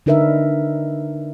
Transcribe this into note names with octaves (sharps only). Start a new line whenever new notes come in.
D3 D4 D#4 A#4 B4 E5